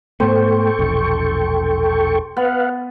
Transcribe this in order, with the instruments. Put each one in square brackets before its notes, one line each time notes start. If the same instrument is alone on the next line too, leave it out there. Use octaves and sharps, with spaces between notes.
[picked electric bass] G#2 A3 B3 [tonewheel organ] A4 G5 C#6 [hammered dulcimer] C5
[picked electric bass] E1 A#1
[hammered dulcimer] B3 [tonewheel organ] B4 F5 F#5